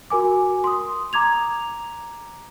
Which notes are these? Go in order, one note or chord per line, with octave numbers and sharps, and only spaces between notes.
F#4 A#4 G#5 D6
C6 D#6
A#5 D6 G#6 F7